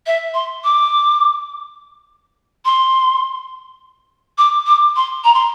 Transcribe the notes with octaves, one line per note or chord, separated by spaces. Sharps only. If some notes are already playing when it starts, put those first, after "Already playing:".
E5
C6
D6
C6
D6
D6
C6
A#5
C6